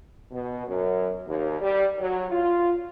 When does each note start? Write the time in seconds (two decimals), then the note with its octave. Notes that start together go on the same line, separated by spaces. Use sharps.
0.31 B2
0.67 F#2
1.27 D#2
1.61 G3
1.99 F#3
2.30 F4